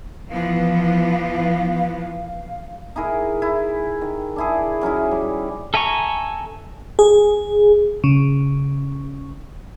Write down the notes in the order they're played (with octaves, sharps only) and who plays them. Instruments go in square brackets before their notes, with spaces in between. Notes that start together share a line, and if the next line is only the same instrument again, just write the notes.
[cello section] E3 F3 B3 [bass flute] F5
[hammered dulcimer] D#4 E4 G#4 A#4
E4
D#3
D4 E4 G#4
F#3 C#4 D#4 E4
G3
[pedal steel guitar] A4 E5 G#5 A#5 C#6
[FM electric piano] G#4
C#3